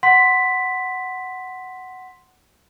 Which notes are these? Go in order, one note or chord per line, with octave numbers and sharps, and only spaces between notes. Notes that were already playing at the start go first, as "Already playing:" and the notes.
F#5 C6 B6